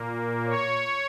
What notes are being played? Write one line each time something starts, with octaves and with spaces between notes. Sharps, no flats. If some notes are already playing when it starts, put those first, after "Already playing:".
Already playing: A#2 A#3
C#5